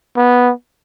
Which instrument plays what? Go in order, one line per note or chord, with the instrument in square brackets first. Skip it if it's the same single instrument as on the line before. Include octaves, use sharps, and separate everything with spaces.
[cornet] B3